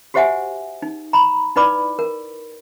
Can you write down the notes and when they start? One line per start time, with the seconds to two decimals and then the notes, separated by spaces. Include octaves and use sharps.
0.14 F#4 G4 C5 E5 F#5 G#5
0.82 D#4
1.13 A#5 B5
1.56 D#4 E4 B4 D5 B5 D6
1.99 A#4